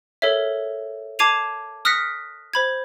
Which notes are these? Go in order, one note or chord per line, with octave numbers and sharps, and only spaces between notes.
A4 A#4 C#5 E5
A5 D6 G#6 C7 D#7 F7
D#6 F6 F#6 A#6 B6 C#7
C5 B5 G#6